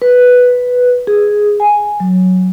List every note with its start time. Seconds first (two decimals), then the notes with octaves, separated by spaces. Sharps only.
0.02 B4
1.07 G#4
1.60 G#5
2.00 F#3